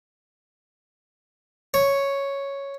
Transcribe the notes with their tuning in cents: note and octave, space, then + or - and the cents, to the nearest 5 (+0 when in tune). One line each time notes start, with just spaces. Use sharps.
C#5 +0